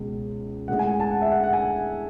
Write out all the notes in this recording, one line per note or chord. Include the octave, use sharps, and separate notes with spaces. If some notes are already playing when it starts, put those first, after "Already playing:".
Already playing: C#2 B2 G#3
A2 G#3 F#5
G#5
A5
F#5
E5
F#5
F#5
G#5